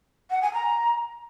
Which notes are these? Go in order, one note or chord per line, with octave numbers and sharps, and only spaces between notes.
F#5
G#5
A#5